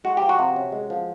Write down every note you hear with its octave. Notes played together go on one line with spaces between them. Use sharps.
G#3 F#4
F3 G4
F#4
C3
C#4
G#3
F3